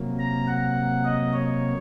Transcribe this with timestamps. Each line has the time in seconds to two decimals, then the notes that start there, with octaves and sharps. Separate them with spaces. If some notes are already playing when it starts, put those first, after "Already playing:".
Already playing: C3 F#3 A#3
0.19 A#5
0.48 F#5
1.05 D#5
1.33 C#5